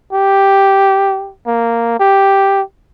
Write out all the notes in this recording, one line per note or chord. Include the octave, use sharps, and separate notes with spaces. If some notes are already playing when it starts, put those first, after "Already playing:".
G4
A#3
G4